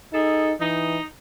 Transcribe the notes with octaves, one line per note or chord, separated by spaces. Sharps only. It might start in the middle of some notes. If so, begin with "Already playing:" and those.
D#4 G#4 A4
E3 D#4